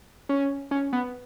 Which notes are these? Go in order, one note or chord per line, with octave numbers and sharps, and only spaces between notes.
C#4
C#4
B3